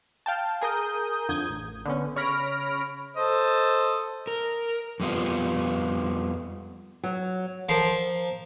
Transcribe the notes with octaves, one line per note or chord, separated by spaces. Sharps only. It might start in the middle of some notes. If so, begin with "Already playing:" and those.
F5 G5 A5
G#4 A#4 D#6 G6
F2 D3 D#6 G6 G#6
A1
D3 B3 C#4
C#3 C#5 B5 F6 A#6 D7
A4 C5 D#5
A#4
F2 G3 B3 F4
F#3
F3 A#4 C6